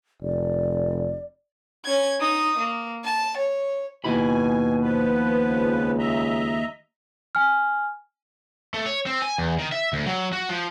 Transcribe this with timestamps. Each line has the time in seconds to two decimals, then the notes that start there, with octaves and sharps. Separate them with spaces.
0.23 F1 D5
1.85 C#4 G#6
2.20 D#4 D#6
2.58 A#3
3.04 A5
3.37 C#5
4.04 D#2 B2 E4 G#5 B5
4.82 F3 B3 B4
5.47 C#2
5.99 D#5 E5 A#5
7.35 G#5 F6
8.74 A3
8.86 C#5
9.06 C4
9.22 G#5
9.38 E2
9.59 D#3
9.72 E5
9.93 D2
10.06 F#3
10.33 F#4
10.49 F3